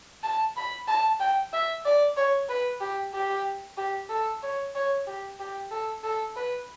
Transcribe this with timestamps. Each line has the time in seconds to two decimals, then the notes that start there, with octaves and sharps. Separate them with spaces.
0.23 A5
0.57 B5
0.88 A5
1.20 G5
1.53 E5
1.85 D5
2.17 C#5
2.49 B4
2.81 G4
3.14 G4
3.77 G4
4.10 A4
4.43 C#5
4.75 C#5
5.07 G4
5.39 G4
5.71 A4
6.04 A4
6.36 B4